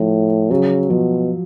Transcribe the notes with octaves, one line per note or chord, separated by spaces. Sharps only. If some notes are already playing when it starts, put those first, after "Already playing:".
Already playing: A2 F3
C#3 F#3
B2 F3